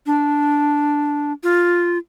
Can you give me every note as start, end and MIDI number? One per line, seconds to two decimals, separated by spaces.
0.06 1.33 62
1.43 1.98 65